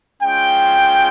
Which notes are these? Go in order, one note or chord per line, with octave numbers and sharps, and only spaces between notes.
G#3 C#4 F4 G5